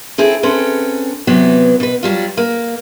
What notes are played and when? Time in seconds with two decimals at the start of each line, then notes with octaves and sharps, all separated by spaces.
0.18 C4 E4 G#4 A4
0.43 C4 C#4 A4 B4
1.27 C3 E3 F#3 B3
1.80 B2 B4
2.03 F#3 G3 F4
2.37 A#3